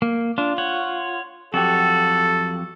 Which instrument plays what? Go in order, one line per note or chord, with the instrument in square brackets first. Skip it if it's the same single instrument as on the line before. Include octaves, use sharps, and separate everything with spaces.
[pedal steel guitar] A#3
[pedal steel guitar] D4 [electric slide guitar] F4
[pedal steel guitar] C#5 F#5
[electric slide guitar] F2 F#3 G4 [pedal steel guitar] F#4 [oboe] A4